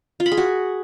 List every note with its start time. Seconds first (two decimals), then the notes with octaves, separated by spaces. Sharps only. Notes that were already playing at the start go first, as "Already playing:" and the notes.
0.20 F4
0.26 B5
0.32 G#4
0.37 F#4